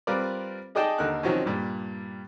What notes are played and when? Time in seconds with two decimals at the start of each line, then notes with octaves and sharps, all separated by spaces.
0.07 G3 C4 F4 A#4 B4 D5
0.75 D#4 G#4 D5 D#5 G5 A5
0.98 D#2 D3 D#4 A#4 F#6
1.23 D#3 F3 F#3 C4 C#4
1.46 G2 A#2 G3